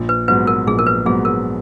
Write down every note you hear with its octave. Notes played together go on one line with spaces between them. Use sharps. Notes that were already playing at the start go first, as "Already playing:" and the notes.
Already playing: A#1
B4
G#2 F#3 B3 B4
A#4
A#1 G#4
A#4
B4
G#2 F#3 B3 G#4
A#4